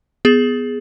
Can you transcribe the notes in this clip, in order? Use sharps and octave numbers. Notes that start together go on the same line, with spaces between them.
B3 G#4